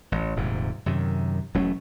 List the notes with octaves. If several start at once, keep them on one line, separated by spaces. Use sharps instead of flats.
A1
D#1 G#2 C3
F#2 C3 D#3
E1 F#3 A3 C#4